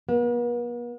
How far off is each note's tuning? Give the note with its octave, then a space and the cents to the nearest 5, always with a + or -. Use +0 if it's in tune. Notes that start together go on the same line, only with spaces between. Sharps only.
B3 -45